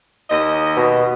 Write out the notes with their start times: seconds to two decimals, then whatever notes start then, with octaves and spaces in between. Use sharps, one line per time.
0.30 D#2 D#5
0.76 B2